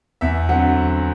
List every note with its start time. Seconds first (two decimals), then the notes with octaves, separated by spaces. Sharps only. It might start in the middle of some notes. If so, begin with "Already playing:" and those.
0.21 E2 E5
0.49 D3 F#3 C4 F#5